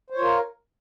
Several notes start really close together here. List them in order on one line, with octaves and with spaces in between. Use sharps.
C5 C#5 F4 A#4